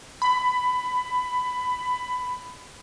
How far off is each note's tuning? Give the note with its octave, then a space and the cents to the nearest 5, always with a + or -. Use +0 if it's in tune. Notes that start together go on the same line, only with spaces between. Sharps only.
B5 +15